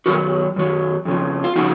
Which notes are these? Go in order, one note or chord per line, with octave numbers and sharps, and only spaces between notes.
F#2 D#3 F#3 F#4 A#4
F#2 D#3 F#3
F2 C#3 F3
F4
C#3 F3 D#4 F#4